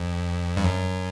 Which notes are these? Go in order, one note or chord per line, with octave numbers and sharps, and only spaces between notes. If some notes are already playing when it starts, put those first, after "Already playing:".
Already playing: F2
G2
F#2